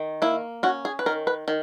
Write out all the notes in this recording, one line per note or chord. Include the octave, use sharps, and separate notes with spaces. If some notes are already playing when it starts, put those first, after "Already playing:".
Already playing: D#3
A#3 E4
C#4 F#4
G#4
B4
D#3 A#4
B4
D#3